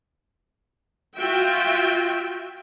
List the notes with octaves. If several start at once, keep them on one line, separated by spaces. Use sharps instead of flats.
F4 F#4 E5 G5